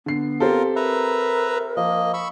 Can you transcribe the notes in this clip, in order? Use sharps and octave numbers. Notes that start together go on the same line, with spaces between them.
D3 B3 C7
C4 F4 G4 A4 A#4
A#4 B4 E5 A#5
F3 A#3 D#5
B5 C#6 E6